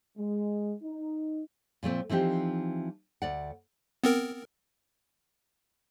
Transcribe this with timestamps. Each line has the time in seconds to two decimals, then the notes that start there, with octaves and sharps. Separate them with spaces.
0.17 G#3
0.83 D#4
1.83 A#2 F3 A3 C4
2.09 E3 F3 C4 D#4 G4
3.22 D2 D5 F#5
4.04 B3 C4 A#4